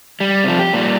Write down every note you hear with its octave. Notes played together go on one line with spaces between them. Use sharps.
G3
C3 F3
G4
A#2 G3